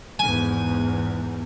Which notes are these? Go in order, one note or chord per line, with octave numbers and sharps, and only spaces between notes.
E2 G#2 G#5